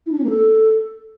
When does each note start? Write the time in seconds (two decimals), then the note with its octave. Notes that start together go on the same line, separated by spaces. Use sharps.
0.06 E4
0.12 D4
0.18 C#4
0.24 A#3
0.30 A4